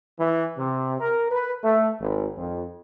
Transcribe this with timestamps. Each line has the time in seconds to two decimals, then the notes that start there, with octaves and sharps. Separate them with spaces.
0.20 E3
0.58 C3
1.00 A#4
1.30 B4
1.64 A3
2.00 G#1
2.38 F2